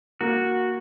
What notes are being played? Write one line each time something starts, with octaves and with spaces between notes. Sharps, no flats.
A#3 F#4